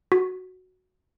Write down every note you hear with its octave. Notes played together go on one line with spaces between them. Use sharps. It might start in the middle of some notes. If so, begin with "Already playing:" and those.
F#4